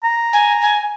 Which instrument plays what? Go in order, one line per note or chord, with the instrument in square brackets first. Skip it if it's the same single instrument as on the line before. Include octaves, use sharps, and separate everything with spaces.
[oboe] A#5
[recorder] G#5
G#5